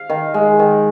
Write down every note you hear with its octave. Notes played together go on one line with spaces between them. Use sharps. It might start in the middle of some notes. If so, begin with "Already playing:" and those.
Already playing: F5
D#3
G#3
D#3